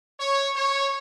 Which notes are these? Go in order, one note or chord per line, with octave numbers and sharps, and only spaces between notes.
C#5
C#5